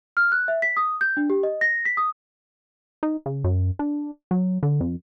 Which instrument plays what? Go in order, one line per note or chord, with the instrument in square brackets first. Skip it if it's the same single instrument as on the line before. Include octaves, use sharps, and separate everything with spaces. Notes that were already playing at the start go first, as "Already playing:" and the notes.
[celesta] F6
F#6
E5
B6
D#6
G6
D4
G4
D#5
A#6
B6
D#6
[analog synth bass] D#4
C#3
F#2
D4
F#3
D3
F2